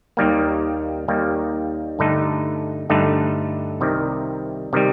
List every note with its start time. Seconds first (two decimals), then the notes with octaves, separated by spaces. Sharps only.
0.17 D#2 D#3 G3 A#3
1.08 D#2 D#3 G3 A#3
1.99 G2 D3 A3 D#4
2.90 G2 D3 A3 D#4
3.81 C2 C3 D#3 G3
4.73 C3 D#3 G3